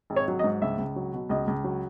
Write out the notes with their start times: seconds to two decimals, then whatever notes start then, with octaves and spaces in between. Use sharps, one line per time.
0.10 G#1
0.16 C#5
0.28 F#3
0.39 D#5
0.44 G#2
0.62 C#2 E5
0.78 C#2
0.96 F#3
1.13 B2
1.29 C#2 D#5
1.47 C#2
1.64 F#3